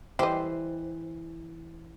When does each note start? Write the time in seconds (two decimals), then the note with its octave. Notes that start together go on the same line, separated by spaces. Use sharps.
0.19 E3 G4 C5 D#5